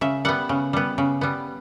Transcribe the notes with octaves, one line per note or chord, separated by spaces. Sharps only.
C#3 E5
G3 B3 F#5
C#3
G3 B3
C#3
G3 B3